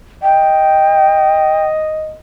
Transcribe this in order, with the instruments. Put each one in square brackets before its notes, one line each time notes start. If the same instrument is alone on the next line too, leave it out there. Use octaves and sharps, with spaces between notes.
[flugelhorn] D#5 [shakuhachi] G5